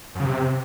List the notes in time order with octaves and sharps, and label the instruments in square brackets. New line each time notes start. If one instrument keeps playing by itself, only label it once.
[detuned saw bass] F#2
C#3
C3